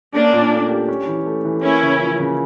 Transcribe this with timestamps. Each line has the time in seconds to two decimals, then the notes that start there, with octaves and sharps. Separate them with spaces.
0.13 A#3 C#4 D4
0.33 A#2
0.51 A3
0.70 G4
0.88 C#4
1.07 E3
1.26 A3
1.45 E3
1.63 A#3 C#4 E4
1.82 C#3
2.01 F3
2.20 C#3